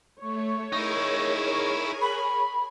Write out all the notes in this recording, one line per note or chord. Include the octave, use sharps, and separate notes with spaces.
A3 C#5
D#4 E4 G#4 A#4 G#5
B5